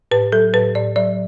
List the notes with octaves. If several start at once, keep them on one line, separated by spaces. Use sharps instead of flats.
A2 B4
F#3 A4
A2 B4
A2 D5
F#3 D5